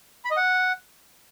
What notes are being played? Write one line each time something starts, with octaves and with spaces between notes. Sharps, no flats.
B5
D#5
F#5